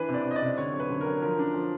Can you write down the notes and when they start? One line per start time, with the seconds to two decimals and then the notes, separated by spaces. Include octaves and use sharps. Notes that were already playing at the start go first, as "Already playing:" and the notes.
Already playing: E3 D4 B4
0.09 C3
0.14 D5
0.25 C3
0.31 D#5
0.36 D5
0.42 C3
0.57 D3 C#5
0.73 F#3
0.79 B4
0.90 D3
1.01 A#4
1.06 F#3
1.22 F3 A#4
1.39 D4
1.54 F3